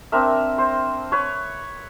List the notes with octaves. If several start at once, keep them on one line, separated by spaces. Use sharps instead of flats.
C4 D4 A#4 E5
C5
B4 C#5